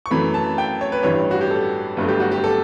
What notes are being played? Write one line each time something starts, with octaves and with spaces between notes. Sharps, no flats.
C#6
F#2 E3 A3 B5
A5
G5
C#5
B4
A1 G2 E3 G3 C#5
F#4
G4
A4
G1 G2 F#3 A3
G4
F#4
G4
A4